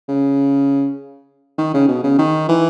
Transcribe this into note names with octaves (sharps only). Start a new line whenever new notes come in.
C#3
D#3
C#3
B2
C#3
D#3
E3